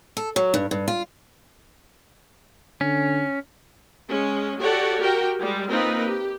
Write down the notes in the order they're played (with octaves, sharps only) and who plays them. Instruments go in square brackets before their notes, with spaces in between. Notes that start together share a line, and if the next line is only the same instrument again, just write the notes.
[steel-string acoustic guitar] A4
F#3
G2
G2
F4
[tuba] D3 [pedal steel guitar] C#4
[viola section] G#3 C#4
F#4 G4 A4 C#5 D5 F#5
F#4 G4 A#4 G5
G3 G#3
A#3 C4 D#4 F4 A#4 B4
G4